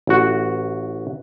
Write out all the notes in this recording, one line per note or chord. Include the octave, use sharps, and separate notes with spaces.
A1 F#4